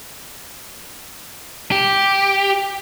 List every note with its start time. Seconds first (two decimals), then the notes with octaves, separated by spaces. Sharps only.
1.72 G4